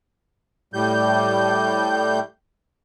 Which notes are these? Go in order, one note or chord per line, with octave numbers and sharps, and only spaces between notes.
A2 G3 G6